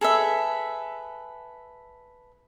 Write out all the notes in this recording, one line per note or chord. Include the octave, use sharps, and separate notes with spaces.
G#4 A4 B4 E5